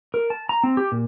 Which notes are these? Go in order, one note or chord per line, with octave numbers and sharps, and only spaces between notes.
A#4
A5
A#5
C4
G4
A#2